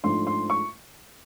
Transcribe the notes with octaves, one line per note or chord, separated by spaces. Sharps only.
G#2 F3 A3 D4 C6
C6
C#6